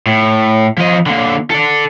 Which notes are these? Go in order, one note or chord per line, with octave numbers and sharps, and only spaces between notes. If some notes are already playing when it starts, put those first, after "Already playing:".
A2
F3 D#5
D3 A#3
A4 D5